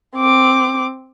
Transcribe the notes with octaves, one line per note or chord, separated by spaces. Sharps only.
C4 D6